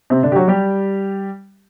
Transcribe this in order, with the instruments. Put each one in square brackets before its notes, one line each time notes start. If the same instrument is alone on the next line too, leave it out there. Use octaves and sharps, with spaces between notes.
[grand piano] C3 C4
D3 D4
G4
F#3 F#4
G3 G4